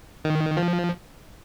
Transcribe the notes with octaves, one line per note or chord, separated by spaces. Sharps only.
D#3
F3